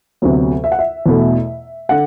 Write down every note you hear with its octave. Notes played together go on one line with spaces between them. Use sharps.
D2 C3 F#3 B3
E5
F#5
E5
E2 B2 A3
D3 F#5